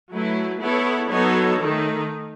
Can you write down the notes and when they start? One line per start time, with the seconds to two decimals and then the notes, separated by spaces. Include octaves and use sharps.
0.13 F#3 A3 E4 B4
0.61 B3 E4 A4 C#5
1.11 F#3 B3 D#4 A4 C#5
1.60 D#3 A3 D#4